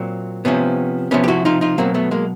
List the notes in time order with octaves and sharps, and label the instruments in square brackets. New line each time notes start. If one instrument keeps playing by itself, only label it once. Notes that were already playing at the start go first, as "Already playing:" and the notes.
Already playing: [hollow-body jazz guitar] A#2 F#3 C4
C3 F3 B3 C#4
C3 F3 B3 C#4
G4
E4 F#4
D#4 F4
D#4 F4
B2 F#3 A#3 C4
A3 B3
G#3 A#3